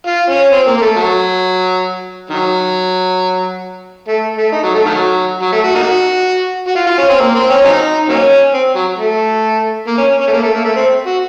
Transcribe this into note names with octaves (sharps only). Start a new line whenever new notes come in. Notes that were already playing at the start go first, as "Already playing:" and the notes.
F4
C#4
C4
A#3
A#3
A3
F#3
D#3 F#3
A3
A3
D#4
F#3
A3
D#3 F#3
F#3
A3
F#4
A#3 D#4 F#4
F#4
F4
F4
C#4
C4
A#3
C4
C#4
F#3 C4 D#4
F#3 A#3 C#4
C4
F#3
A3
A#3
C#4
C#4
A3
A#3
A3
A#3
A3
C4
F#4